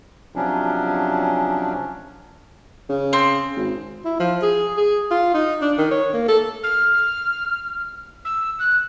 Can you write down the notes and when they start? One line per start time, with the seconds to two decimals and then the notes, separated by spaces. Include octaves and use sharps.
0.36 C3 F3 F#3 C#4 D4
2.89 C#3
3.13 C4
3.56 G#1
4.05 E4
4.20 F3
4.42 G#4
4.77 G#4
5.11 F4
5.34 D#4
5.62 D4
5.78 D#3
5.91 C#5
6.13 A#3
6.28 A4
6.64 F6
8.25 E6
8.59 F#6